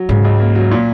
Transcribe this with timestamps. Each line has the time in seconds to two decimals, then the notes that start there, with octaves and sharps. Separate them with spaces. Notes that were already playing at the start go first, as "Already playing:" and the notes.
Already playing: F#3
0.09 G#2 C#3
0.25 C#2
0.40 A#3
0.55 F#3
0.71 A#2